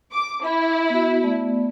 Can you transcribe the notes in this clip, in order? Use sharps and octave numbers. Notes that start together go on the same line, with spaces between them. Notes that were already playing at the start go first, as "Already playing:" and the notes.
D6
E4 B5
B3 F#4
A3 B3 D5